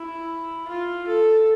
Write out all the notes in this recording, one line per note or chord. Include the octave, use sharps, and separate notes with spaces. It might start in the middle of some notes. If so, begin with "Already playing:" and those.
Already playing: E4
F4
A4